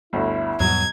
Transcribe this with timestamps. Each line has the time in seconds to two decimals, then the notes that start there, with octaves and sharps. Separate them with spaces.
0.13 G1 D2 E4
0.60 E2 G#2 B2 F#3 G3 G#6